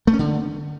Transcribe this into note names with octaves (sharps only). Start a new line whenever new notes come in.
A3
C#4
D3